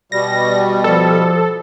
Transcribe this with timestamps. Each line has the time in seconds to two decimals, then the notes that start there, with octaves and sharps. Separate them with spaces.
0.12 B2 G3 A#6
0.84 F3 A4